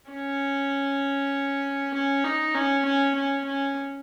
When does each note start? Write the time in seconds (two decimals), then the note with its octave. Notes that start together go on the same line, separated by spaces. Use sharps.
0.11 C#4
1.94 C#4
2.24 D#4
2.54 C#4
2.85 C#4
3.15 C#4
3.45 C#4